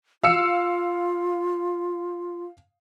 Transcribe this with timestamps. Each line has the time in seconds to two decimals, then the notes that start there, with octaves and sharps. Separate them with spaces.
0.23 F4 F5 E6 C#7